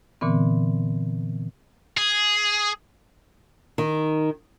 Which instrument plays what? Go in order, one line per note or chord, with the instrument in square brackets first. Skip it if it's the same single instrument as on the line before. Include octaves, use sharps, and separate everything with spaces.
[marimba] A#2 D3 E3 B3 C4
[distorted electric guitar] G#4
[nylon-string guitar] D#3